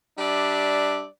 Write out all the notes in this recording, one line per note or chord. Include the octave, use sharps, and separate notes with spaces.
G3 D4 D5 E5